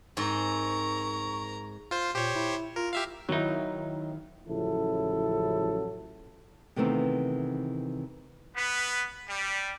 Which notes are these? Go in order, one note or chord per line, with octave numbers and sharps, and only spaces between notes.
G#2 C4 A#4 A#5 C#6
F4 C5
A#2 G4 C5 C#5
E4
F4 A#4
G4 E5 F5
D#3 F#3 D#4 E4
A1 C#3 F3 F#3 E4 A4
C3 D#3 E3 A3 B3 C4
B3 B4
G3